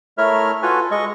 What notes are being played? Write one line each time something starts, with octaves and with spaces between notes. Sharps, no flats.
A3 E4 A#4 C#5 E5 F6
F4 F#4 A4 B4 G#5
G#3 D#5 C#6